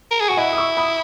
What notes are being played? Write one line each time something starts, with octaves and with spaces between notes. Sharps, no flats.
A#4
G#4
F#4 G#5
E4 D#5 F#5
D#6
C#6 E6
B5 D#6